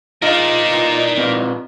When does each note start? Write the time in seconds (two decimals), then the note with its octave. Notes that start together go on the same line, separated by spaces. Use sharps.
0.22 F3 G#3 D#4 F4 A#4 D5
0.70 E3 G3 D4
1.18 C4 F4 B4